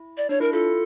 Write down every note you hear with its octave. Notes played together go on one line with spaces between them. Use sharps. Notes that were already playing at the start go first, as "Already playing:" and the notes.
Already playing: E4
D5
D4 C#5
E4 A#4
F4 A4